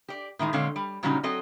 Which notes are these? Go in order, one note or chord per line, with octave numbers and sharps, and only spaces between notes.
G4 D5
A2 D#3 G#3 D#4
A#2 D3 G#3 C4 C#5 F5
G3
A#2 C#3 F#3 G3 C#4 D#4
F#3 C4 A4 D#5